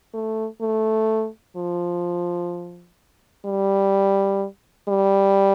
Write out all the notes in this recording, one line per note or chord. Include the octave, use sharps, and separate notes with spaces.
A3
A3
F3
G3
G3